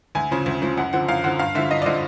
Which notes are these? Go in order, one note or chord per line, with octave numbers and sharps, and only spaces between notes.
D2 G#5
C#3 F3
D2
C#3 F3
F#2 F#5
D3 F3 F#5
F#2 F5
D3 F3 F#5
G2 F5
D3 F3 E5
G2 D#5
D5
D3 F3 D#5